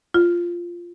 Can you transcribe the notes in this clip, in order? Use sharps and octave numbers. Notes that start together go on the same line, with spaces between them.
F4